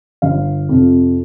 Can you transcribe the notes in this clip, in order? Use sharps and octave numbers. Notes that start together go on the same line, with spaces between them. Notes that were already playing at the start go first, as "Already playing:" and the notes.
G1 F5
F2 C3